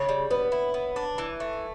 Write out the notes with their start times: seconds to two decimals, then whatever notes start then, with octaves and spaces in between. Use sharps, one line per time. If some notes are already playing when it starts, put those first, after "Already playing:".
Already playing: C#3 C#5
0.09 G3
0.30 B3 B4
0.52 E4
0.74 B3
0.96 D4
1.18 E3
1.40 A3